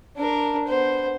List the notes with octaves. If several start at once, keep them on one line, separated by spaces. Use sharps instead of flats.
D4 A#4
B3 C5